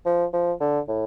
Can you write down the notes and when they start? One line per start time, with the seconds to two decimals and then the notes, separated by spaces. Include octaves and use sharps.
0.06 F3
0.33 F3
0.60 D3
0.88 A2